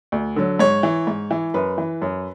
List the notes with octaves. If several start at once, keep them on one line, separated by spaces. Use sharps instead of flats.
D2
D3 F#3
G#2 C#5
E3
G#2
E3
F#2 B4
E3
F#2